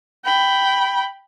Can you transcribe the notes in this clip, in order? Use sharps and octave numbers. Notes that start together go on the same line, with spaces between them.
G5 B5